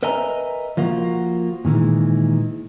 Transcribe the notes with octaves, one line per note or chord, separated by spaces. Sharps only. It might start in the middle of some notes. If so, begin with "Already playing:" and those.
A#4 B4 D#5 E5 G#5 A#5
F3 A#3 F4 F#4
A#2 D#3 E3 G#3